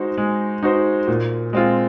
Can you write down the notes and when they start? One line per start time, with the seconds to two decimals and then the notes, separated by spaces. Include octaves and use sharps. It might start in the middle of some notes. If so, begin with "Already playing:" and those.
Already playing: G#3 D#4 F#4 C5
0.18 G#3
0.63 D#4 F#4 C5
1.07 A#2
1.53 G#3 C4 F4